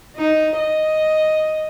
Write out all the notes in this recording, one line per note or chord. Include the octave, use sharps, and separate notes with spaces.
D#4
D#5